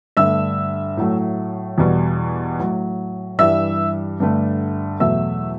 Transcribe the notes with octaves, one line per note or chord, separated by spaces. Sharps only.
G2 D3 A3 E5 E6
A2 F#3 A3
E2 B2 G3
A2 F#3 A3
G2 E3 G3 E5 E6
G2 D3 A3
E2 B2 F#3 A3 E5 E6